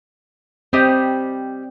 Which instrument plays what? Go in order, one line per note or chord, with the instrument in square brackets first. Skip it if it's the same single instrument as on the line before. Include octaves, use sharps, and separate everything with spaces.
[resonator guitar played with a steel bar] G3 G4 D#5 [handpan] C4